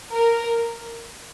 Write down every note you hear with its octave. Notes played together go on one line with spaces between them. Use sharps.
A#4